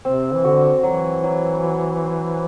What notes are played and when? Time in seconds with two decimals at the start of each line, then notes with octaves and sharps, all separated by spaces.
0.04 C3 C4
0.34 E3
0.44 D3 F#4
0.83 E3 F#3
1.24 F#3
1.63 F#4
2.02 C5